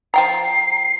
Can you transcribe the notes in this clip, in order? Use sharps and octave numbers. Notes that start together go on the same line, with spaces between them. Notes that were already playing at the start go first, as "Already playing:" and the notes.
F3 G5 A#5 C7